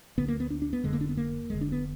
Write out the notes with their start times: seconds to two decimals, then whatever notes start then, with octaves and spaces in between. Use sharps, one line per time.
0.18 D2 D3 B3
0.28 A#3
0.40 B3
0.50 D4
0.62 D4
0.73 B3
0.84 F1 F2 D3 G#3
0.93 A#3
1.01 D4
1.09 B3
1.17 A#3
1.50 F1 F2 D3 G#3
1.61 D4
1.72 B3